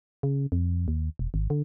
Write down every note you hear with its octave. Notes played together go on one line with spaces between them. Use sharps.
C#3
F2
D#2
E1
G#1
D3